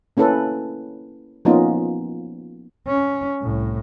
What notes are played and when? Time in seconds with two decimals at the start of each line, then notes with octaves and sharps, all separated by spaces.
0.17 A#3 C#4 E4 A4 B4
1.45 F3 A#3 B3 C#4 D#4 F4
2.87 C#4
3.42 C2 A2